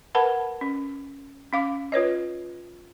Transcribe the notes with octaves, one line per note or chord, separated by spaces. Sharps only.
A#4 B4 F#5 A5 B5
C#4
C#4 F5 D6
F4 B4 C#5 D#5